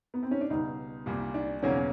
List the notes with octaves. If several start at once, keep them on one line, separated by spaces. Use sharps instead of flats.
B3
C4
C#4
D4
C#2 B2 G3 D#4
C2 A#2 G3 A#3
D4
E1 E2 C#3 F#3 A#3 C#4